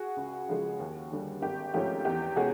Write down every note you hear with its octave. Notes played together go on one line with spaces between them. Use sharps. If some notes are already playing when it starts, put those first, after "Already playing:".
Already playing: F#4 G#4
C#2
C#3 F3 G#3
D#2
D3 G3
G#1 G4
G#2 F3 A3 C#4 G4
E2 G4
B2 G#3 C#4 F#4 G#4